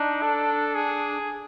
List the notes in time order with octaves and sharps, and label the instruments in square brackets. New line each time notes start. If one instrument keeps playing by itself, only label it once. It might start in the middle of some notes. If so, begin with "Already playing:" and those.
Already playing: [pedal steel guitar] D4 [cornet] D#4
[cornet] A4
G#4